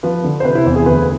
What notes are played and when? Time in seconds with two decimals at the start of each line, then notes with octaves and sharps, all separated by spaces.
0.03 F3 B4
0.24 D3
0.40 C5
0.44 C3 B4
0.55 E4
0.66 E2
0.76 G#4
0.86 D2 B4